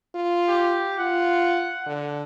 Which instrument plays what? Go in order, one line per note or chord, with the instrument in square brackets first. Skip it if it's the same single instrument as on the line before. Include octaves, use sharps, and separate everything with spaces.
[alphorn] F4
[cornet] G4
[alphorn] F4 [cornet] F#5
[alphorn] D3